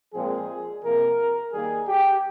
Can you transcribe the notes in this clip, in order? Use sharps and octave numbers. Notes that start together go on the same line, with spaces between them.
A#2 F3 G#3 C4 G#4
C3 F3 A#3 A#4
D#3 G3 A#3 G#4
G4